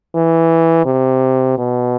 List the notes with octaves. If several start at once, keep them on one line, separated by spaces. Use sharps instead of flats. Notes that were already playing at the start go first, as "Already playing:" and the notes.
E3
C3
B2